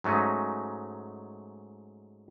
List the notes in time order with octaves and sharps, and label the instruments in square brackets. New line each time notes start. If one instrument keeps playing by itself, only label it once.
[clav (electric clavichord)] G#2 F#3 A3 C#4 D#4